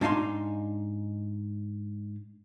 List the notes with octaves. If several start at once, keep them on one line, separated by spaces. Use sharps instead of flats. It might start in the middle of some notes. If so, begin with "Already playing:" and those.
G#2 D4 D#4 F5 G#5 C6